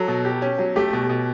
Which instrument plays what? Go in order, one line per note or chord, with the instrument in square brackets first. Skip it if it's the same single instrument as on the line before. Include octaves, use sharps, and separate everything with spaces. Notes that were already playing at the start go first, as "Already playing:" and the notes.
Already playing: [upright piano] F#3 [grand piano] A4
[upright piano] B2
G4
C#4
F#3
[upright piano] A3 [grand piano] G4
[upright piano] B2
B2